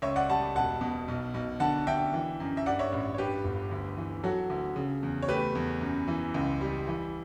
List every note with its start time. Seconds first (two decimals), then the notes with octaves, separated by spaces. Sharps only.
0.02 C#2 C#5 E5
0.16 D5 F#5
0.29 G3 F#5 A5
0.55 E1 F#5 A5
0.81 B2
1.08 B1
1.34 B1
1.60 D3 F#5 A5
1.87 D3 E5 G5
2.13 E3
2.40 F#2
2.57 E5
2.66 G2 D5 F#5
2.79 C#5 E5
2.92 A1
3.14 C#5
3.18 G2 G4 B4
3.44 G1
3.71 D2
3.97 E3
4.24 F#3 F#4 A4
4.50 D2
4.76 C#3
5.03 E2
5.22 C#5
5.28 A3 G4 B4
5.55 E2
5.81 F#2
6.08 E3
6.34 C#2
6.61 G3
6.87 E3